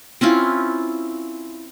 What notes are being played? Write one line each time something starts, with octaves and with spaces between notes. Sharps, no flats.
C4 C#4 E4 F4